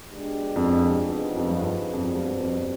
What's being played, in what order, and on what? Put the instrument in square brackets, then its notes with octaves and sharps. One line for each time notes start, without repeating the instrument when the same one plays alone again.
[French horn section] B2 G#3 D4 G4
[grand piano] F2
[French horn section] C3 F3 B3 D#4 G#4
[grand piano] F2
G2
[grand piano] F2 [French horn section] B2 G3 C4
[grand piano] G2
F2